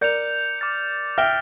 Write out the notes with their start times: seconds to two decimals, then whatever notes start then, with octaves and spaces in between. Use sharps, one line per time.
0.01 A#4 D5 G6 C#7 F7
0.59 D6 F6 A6 C#7
1.18 E5 G5 F6 A#6 D7 G7